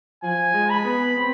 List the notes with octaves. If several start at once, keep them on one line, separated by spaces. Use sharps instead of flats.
F3 G#5
G#3
B5
B3
C4